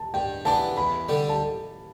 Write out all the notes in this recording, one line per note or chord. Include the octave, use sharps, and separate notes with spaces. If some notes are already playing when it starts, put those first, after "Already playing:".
Already playing: A5
G2 G5
E3 B3 D4 A5
E2 B5
D3 G3
A5